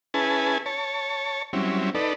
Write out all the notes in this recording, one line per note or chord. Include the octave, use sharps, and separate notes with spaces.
C#4 E4 G#4 B4 G#5 A5
C#5 A5
F#3 G3 C4 C#4 E4
D#4 A4 B4 D5